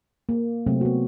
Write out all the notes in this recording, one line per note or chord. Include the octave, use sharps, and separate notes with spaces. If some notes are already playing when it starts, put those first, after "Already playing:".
A#3
C3 F#3 A3 C4
B3 F#4